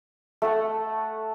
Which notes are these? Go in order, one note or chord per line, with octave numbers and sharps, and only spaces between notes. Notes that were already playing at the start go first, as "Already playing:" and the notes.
A3 A4 F#5